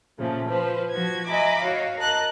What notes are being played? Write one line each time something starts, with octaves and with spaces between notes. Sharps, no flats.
A#2 C#3 F3 A3
F3 B4 C5
F3 F#4 G#6
D#5 E5 G#5 A#5 B5 D6
F#4 C#5 D#5 F5
A#4 D#5 A5 F#6